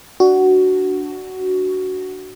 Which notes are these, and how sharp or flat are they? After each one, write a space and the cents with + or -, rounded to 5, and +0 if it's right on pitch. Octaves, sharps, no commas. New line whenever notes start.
D4 +0 F#4 +10